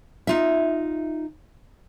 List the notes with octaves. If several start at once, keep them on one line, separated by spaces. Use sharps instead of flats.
D#4 F4 E5